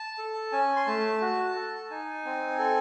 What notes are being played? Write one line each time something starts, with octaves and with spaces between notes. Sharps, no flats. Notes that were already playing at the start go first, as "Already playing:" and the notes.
Already playing: A5
A4
C#4 G#5
C6
A3 A5
F#4
A4
D#4 G#5
C4
A4